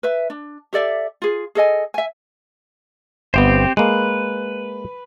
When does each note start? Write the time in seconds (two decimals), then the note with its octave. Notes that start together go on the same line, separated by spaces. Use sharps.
0.03 B4 E5
0.30 D4
0.73 G4 A4 D5 E5
1.22 F4 G#4
1.55 G#4 A4 D#5 G#5
1.94 E5 G#5
3.34 G1 B3 C4 G4 C5
3.77 G#3 A#3 B4